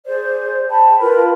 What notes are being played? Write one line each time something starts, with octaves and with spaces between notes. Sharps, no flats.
G#4 C5 D5
G5 A5 B5
F4 A#4 B4 B5